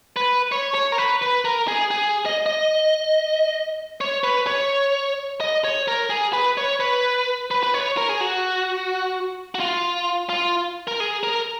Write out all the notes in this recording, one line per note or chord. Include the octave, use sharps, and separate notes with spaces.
B4
C#5
C#5
A#4
B4
B4
A#4
G#4
G#4
D#5
D#5
C#5
B4
C#5
D#5
C#5
A#4
G#4
B4
C#5
B4
B4
B4
C#5
A#4
G#4
F#4
F#4
F4
F4
A#4
G#4
A#4